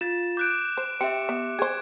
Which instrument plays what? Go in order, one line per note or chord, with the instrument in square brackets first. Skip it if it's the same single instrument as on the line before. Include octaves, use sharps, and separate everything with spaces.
[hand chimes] F4 A6 [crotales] E7
[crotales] D6 F#6 D7 [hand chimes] G6
[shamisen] C5
[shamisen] C4 [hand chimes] G4 E5 [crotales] C#7
[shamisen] B3
[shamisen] G#4 C5 [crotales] G#6